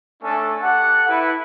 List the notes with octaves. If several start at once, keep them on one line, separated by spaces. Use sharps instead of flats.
A3 C#4 D4 A4
G4 A4 F#5
E4 B4